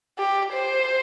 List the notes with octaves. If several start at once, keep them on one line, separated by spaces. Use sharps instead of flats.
G4
C5